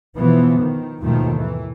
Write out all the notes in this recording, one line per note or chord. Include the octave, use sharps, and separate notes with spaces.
B2 E3 F3 B3
D#3
D#2 G#2 B2 D#3 F3 A3
E3